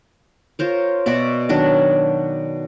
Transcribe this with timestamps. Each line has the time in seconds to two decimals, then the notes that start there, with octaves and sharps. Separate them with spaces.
0.59 F4 A#4 C5 C#5
1.06 B2 F#4 D5 E5
1.49 D#3 F#3 D4